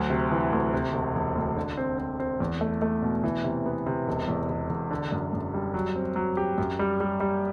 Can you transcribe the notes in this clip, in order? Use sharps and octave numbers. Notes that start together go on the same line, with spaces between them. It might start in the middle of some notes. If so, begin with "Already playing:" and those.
Already playing: D2 F#3
C3
E3
D2
C3
E1
E1
D2
D3
C4
C4
C4
E2
A3
A3
B2
E3
C3
B3
C3
E1
E2
E1
E1
D3
F#2
F#2
G3
F#3
C4
F#3
G4
F#2
G3
G3
G3